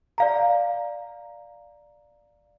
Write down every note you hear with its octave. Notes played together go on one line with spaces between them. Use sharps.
D5 F5 A#5